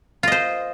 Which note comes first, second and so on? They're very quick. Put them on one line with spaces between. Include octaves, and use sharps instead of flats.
F4 D#5 C5